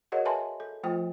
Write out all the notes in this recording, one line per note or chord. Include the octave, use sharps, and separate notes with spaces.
F#4 G#4 A#4 C#5 D#5 F#5
B4 E5 G#5 A5 B5 C6
A4
F3 A3 F4 C5 G5